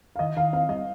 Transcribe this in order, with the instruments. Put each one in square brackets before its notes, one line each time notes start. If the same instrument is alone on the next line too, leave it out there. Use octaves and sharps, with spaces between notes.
[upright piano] F5
[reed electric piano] D#3 [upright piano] D#5
[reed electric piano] D#3 [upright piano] F5
[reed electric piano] C4 [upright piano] F5
[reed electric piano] G3 [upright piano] D#5